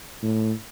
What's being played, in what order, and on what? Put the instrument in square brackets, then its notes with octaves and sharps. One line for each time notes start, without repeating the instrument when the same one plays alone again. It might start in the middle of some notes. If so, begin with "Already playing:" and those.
[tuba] A2